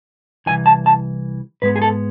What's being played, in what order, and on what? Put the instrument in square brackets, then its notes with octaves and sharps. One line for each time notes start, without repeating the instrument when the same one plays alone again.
[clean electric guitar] C2 C3 E3 G#5
A5
A5
G#2 G#3 B3 B4
G#4
A4